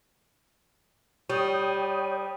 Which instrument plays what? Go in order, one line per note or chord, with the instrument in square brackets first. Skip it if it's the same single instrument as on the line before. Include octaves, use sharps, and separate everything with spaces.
[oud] G3 [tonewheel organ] C#5 G5 D#6